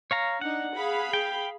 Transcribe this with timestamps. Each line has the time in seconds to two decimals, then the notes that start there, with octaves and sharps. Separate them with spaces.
0.11 C#5 F5 A#5
0.41 D4 D#4 F#5
0.75 G#4 F5 B5
1.13 G5